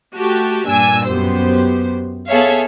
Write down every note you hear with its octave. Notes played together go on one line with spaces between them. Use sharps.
A3 F#4 G4 A5
G2 A#2 D4 G#5 E6
F#2 B3 G4 C5
B3 G#4 A4 C#5 E5 F5